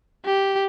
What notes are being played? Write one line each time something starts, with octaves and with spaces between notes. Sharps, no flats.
G4